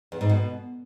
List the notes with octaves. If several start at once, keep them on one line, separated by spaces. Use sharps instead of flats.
E2
G#2
B2